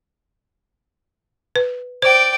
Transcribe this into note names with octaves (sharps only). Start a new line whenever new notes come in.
B4
C5 D5 G5